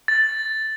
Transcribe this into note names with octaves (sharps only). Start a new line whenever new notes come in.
A6